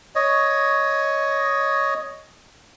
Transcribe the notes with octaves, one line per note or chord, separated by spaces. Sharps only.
C#5 D#5